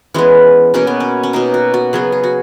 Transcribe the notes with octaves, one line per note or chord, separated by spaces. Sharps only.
E3 G#3 B3 C#4
B2 A#3 C#4
B3
C#4
C#4
B2 A#3 D#4
F#4
F#4
C#3 F#3 B3 G#4
G#4
F#4